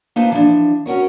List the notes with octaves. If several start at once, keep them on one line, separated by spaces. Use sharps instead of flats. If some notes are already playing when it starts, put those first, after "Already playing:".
A#3 D#4 F4 B4 C5 A5
E3 F3 D4
C#4 F#4 A#4 C#5